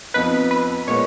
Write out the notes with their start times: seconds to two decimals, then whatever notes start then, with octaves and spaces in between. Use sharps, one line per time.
0.14 F2 F3 B3 D#4 B4
0.51 B4
0.87 A#2 G#3 B3 C#5